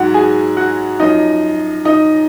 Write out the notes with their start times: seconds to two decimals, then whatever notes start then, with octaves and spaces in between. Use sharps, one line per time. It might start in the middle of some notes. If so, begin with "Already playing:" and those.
Already playing: G#2 F#3 F#4 F#5
0.14 G#4 G#5
0.57 F#4 F#5
1.00 F#2 F3 D#4 D#5
1.85 D#4 D#5